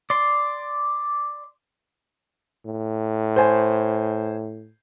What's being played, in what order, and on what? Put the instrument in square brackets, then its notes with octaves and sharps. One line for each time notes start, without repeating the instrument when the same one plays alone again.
[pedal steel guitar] D5 C6
[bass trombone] A2
[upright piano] C5 G#5